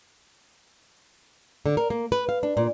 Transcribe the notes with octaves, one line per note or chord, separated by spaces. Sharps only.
D3
A#4
A#3
B4
F5
D4
A#2